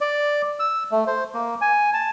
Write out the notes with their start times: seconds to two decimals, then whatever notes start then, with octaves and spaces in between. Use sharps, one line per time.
0.01 D5
0.60 E6
0.92 A3
1.07 C5
1.34 A#3
1.61 G#5
1.94 A5